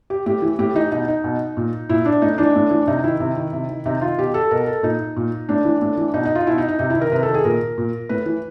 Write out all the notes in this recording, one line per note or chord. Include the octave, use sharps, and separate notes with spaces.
G4
A2 G4
E3
A2 G4
E3 D#4
B2 D#4
D#4
B2
A#2
A#2 E4
D4
A2 D#4
E3 D4
A2
E3
C3 D#4
D#3 E4
C3
D#3
C3
D#3
C3 D#4
D#3 F4
B2 G4
A4
B2 A#4
A4
A#2 D#4
A#2
A2 D4
E3
A2
E3
B2 D#4
D#4
F4
B2 E4
D#4
D#4
C3 D#4
E4
D#3
A#4
C3 B4
A4
D#3
G#4
A#2 A#4
A#2
A2 B4
E3